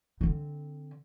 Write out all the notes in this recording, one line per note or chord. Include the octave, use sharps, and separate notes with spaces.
D3 C4